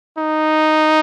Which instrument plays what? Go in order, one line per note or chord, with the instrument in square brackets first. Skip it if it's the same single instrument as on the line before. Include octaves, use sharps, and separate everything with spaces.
[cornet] D#4